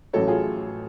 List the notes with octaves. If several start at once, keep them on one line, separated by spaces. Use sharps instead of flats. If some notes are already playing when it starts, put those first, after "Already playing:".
A1 A2 F#3 A4 C#5
F4 G#4